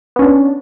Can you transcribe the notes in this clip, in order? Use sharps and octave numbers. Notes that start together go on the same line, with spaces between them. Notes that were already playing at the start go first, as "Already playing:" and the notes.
B3 C#4 D4